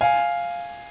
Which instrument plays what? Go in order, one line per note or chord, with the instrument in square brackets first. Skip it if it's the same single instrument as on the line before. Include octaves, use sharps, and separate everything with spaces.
[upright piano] F5 G#5